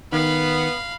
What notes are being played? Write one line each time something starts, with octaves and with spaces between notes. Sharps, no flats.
D#3 B3 F5 B5